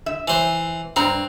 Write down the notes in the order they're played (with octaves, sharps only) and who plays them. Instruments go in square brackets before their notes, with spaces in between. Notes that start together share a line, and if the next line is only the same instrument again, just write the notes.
[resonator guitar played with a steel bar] E5
[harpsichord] E3 C5
[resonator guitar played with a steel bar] G2 A#5 [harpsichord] C4